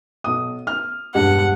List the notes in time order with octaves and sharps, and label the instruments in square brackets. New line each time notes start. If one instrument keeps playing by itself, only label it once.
[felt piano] B1 D#6
F6
[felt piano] E1 G2 [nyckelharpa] F#5